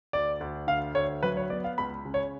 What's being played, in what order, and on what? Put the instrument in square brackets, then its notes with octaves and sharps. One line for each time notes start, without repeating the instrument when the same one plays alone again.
[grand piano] D2 D5
D2
D3 F5
D2 C#5
F#3 B4
C#5
B3 D5
F5
C#2 B5
C#3
C#5